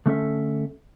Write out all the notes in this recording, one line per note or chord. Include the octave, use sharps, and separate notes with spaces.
D3 A3 C#4 A4 E5